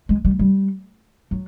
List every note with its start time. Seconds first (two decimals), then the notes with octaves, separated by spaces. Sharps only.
0.09 G#3
0.25 G3
0.39 G3
1.31 F#3